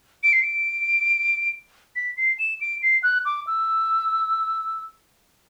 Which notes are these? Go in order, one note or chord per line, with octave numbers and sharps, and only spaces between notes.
D7
C7
D7
B6
C7
E7
D7
C7
F#6
D6
E6